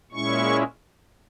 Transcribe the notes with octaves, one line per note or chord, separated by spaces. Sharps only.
A#2 G#3 C#4 E4 C#6